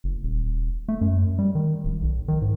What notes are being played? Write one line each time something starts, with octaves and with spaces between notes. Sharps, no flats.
F#1
D#1
A3
F#2
G3
D#3
D1
B1
D#3
G#2